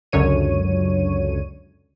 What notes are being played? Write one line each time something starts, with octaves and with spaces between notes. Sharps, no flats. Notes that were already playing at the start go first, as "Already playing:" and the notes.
C#2 F#2 D3 C#5 D#7